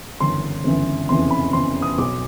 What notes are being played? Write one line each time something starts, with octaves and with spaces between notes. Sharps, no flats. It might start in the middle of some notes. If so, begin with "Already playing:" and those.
G1 F#2 C#3 E3 C6
G1 F#2 C#3 E3
F1 E2 C#3 E3 C6
B5
F1 E2 C#3 E3 C6
D#6
B1 B2 D6